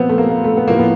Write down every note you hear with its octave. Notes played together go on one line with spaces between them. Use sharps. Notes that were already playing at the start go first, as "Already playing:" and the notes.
Already playing: A#2 F3 B3 C4
A3
A#3
A#3
A3
B3
A2 F3 A#3
B3